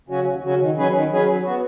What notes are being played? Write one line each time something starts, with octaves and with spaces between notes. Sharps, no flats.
C#3 F#3 C#4 F#4
D#2
C#3 F#3 C#4 F#4
D#3
F#3 C#4 G#4 B4
D#3
F#3 C#4 G#4 B4
F#3
B3 F#4